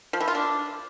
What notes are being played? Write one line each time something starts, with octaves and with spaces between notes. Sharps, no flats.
F3
E3
F4
D4